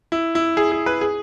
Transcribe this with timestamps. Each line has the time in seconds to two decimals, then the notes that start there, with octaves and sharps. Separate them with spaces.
0.12 E4
0.35 E4
0.57 G#4
0.72 G#4
0.86 B4
1.01 G#4